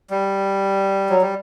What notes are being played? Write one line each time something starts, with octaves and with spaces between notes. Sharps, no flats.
G3
F#3
G3